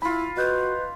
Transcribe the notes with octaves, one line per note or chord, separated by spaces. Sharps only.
E4 F4 B5
F#4 B4 D#5 F#6 G6